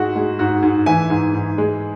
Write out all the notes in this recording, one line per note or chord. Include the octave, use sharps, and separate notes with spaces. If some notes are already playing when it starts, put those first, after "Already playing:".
Already playing: G#2 G#3 E4 F#4
G#3
G#2 F#4
G#2
E3 E5 G#5
G#2
G#2
G#3